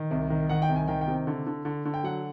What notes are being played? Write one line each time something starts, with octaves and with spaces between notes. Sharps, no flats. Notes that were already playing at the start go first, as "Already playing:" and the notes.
Already playing: D#3
C2
D#3
D#3 F#5
G5
C2
G#5
D#3 G5
G5
C3
D3
D3
D3
D3
G5
F#3 F#5